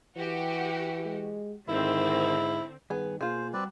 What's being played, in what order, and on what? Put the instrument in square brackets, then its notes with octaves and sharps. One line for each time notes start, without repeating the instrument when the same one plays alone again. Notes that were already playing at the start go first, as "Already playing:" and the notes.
[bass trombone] E3 [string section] F#4 G4
[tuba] G#3
[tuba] G#2 [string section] D3 C4 [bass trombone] D#3 [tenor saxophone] E4
[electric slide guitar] G2 D#3 [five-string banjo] B3 G#4
[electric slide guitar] B2 A#3 [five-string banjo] F4 G#4 [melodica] C5
[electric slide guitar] G3 F#4 [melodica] C4 B4 D5